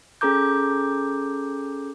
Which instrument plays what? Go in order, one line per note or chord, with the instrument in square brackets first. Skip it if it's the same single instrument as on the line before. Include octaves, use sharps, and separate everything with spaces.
[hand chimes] C#4 G#4 A4 A#5 D6 G6